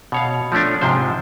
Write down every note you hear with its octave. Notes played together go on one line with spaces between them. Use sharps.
B2 C#5 F5
F3 A3 C#4 D4
G#2 C3 F3 C5